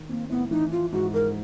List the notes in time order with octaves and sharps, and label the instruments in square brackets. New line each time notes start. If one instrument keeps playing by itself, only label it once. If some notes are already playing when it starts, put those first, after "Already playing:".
Already playing: [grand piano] D#3
[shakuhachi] A#3 [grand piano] C4
[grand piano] A2 [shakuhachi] B3
[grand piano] E3 [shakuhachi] D#4
[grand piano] F3 [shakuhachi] F4
[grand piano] G#2 [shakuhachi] F#4
[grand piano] G#2 [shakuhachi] A#4